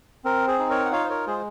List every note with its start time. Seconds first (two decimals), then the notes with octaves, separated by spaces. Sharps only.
0.24 C4 A#4
0.47 G#4 C5
0.59 D#4
0.70 A#4 C#5
0.85 F#5
0.92 F4 C#5 F5
1.04 C5
1.10 A#4 C#5
1.27 G#3 G#4 C5